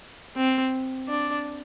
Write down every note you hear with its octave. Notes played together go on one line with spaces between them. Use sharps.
C4
D4